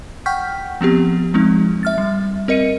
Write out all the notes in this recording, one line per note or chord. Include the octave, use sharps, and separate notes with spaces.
F#5 G5 C#6 F6 G6 B6
F3 B3 C4 G4
F3 G#3 C4 D#4
E5 F6 A6
G3
C4 A#4 D#5 C#7 D#7